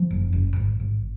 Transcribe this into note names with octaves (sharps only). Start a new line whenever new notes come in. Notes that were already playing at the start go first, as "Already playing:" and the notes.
Already playing: F3
F#1
F#1
G#1
G#1